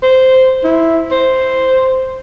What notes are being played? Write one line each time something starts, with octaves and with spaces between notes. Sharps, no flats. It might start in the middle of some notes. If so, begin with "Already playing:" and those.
C5
E4
C5